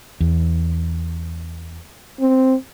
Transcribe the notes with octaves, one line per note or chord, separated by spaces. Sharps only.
E2
C4